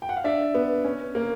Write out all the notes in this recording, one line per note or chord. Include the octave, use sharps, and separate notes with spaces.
G5
F#5
F5
D4 D5 E5
B3
C#4
A#3